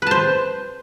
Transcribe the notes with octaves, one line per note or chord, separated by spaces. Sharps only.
B4 C5 A5